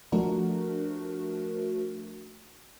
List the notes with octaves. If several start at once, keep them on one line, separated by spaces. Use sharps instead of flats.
F3 A3 D4 F#4 A#4